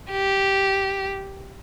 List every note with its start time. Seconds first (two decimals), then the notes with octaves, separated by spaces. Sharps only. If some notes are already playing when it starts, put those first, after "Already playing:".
0.11 G4